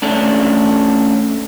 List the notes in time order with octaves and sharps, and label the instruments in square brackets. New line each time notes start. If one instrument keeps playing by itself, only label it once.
[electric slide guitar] A3 C#4 D4